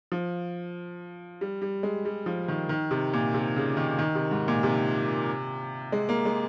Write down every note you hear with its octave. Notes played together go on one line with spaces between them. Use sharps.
F3
G3
G3
G#3
G3
F3
D#3
D#3
C3
A#2
C3
C#3
D#3
D#3
C3
G#2
A#2
C3
G#3
A#3
G#3